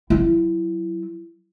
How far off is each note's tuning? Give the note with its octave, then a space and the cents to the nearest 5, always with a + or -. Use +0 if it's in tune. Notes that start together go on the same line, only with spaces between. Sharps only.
F#3 +0 E4 +15